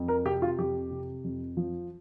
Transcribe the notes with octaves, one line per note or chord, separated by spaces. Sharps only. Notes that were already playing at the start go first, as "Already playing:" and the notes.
Already playing: F2
A#4
C3 G4
F4
F2 G4
C3
F2
F3